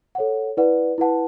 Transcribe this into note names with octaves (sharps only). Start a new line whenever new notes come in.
A4 C#5 F#5
E4 B4 D5 F#5
E4 B4 F#5 A5